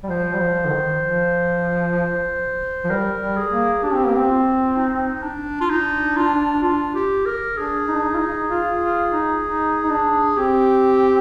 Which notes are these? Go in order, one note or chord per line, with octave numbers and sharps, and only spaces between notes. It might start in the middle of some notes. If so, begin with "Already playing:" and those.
G3
F3 C5
G3
F3
D3
D#3
F3
F3
G3 A#4
G3
G#4
A#3
D4 G4
C4
A#3
C4
F4
D#4
D4
F4
D4 D#4
F4
F4
G4
A#4
D4 G#4
D#4
D4
D#4
F4
D#4
F4
F4
D#4
D#4
D#4
D4
C4 G4